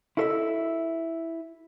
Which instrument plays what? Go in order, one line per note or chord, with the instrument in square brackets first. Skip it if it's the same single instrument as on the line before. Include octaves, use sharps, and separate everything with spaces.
[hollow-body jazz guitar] E4 F#4 A4 B4 D#5 E5